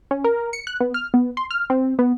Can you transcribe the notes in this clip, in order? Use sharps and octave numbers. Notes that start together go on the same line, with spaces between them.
C#4
A#4
C#7
F#6
B3
F6
B3
C6
F6
C4
B3